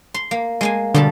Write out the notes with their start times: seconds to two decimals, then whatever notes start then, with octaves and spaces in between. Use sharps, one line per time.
0.14 C6
0.31 A#3
0.61 G#3 A#3 G#5
0.94 B2 D3 G3 A5